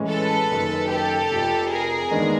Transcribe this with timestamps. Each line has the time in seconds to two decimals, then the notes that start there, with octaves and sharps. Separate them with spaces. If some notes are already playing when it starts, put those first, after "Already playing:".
Already playing: A2 E3 G#3 C#4
0.10 A4 B4
0.51 F#1 F#2 D#3
0.91 G4 A4
1.31 F1 F2 C3
1.71 G#4 A#4
2.11 D#2 D#3 G#3 B3 D4